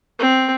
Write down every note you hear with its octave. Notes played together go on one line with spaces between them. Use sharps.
C4